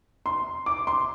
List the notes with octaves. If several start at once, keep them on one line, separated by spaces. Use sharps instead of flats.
C6
D6
C6